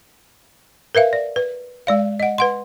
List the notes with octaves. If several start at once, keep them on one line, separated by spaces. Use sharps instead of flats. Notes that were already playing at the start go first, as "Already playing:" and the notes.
A#4 B4 E5 F5
D5
B4
G#3 D5 F5
D#5 F#5
B4 F#5 C6